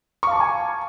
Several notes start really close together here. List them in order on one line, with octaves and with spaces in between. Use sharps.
C#6 F5 A5 D6 G#5